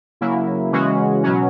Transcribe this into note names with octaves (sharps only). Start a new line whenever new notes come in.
C#3 F#3 A#3 E4
C#3 E3 G#3 C#4 F#4
B2 F#3 C#4 F#4